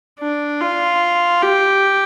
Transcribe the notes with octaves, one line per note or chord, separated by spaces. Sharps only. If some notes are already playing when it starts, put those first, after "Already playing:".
D4
F4
G4